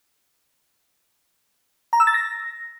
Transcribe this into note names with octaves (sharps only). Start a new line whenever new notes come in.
A#5
E6
A6
A#6